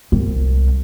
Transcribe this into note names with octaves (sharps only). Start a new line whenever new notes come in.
C2